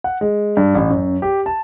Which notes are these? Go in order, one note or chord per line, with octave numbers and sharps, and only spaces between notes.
F#5
G#3
G2
A1
F#2
G4
A5